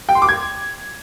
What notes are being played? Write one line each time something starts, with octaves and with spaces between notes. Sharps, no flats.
G5
C6
D6
G#6